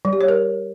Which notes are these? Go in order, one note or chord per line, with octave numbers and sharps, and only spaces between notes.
G3
G4
C#5
A#4